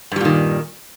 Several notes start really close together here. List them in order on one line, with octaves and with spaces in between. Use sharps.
G2 G3 A#2 D#3